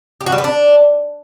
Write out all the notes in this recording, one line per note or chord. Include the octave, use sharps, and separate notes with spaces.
G4
F#4
G3
B3
D4